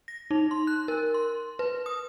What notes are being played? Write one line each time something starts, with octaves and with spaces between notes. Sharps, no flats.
A#6
D#4
C6
F#6
A#4
C6
B4
D#6